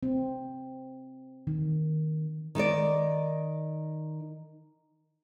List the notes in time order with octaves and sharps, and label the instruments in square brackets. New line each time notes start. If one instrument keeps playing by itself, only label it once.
[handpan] C4
D#3
[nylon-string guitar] D#3 D#4 A#4 D5